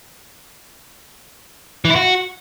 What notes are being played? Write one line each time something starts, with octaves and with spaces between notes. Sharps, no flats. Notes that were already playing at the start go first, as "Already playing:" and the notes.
E3
E4
F#4